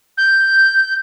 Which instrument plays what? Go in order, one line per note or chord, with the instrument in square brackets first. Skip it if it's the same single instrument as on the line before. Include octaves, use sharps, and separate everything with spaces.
[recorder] G6